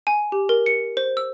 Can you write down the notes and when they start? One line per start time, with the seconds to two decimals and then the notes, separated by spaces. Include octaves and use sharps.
0.07 G#5
0.32 G4
0.49 A#4
0.66 C#7
0.97 C5
1.17 E6